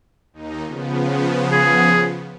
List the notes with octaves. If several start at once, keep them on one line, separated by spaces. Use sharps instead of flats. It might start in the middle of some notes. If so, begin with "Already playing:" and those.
D#2 D#4
C#3 F3 B3
G#4